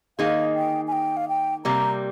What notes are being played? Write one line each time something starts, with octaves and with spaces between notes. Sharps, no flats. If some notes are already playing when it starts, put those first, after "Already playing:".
D#3 A#3 D#4 G#4 F5
G5
G#5
G5
F5
G5
C3 G3 A#3 A#5